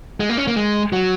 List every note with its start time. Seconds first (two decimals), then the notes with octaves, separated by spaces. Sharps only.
0.20 G#3
0.30 A#3
0.38 C#4
0.48 A#3
0.57 G#3
0.93 F#3